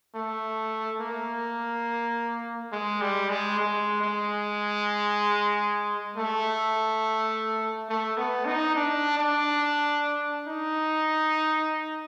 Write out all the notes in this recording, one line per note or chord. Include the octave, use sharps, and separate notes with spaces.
A3
A#3
G#3
G3
G#3
G#3
G#3
A3
A3
B3
D#4
D4
D4
D#4